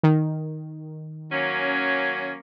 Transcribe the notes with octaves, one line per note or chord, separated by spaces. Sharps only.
D#3
F#3 A#3 C#4